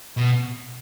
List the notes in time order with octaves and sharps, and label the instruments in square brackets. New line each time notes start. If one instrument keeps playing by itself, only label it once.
[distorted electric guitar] B2